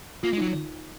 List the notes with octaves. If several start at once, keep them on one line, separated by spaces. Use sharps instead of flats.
A#3 F4
G#3
F#3 D#4